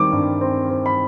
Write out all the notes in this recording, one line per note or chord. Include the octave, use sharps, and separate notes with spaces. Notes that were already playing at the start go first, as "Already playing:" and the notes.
Already playing: D#3 G3 C4 D6
G2
C4
C4
B5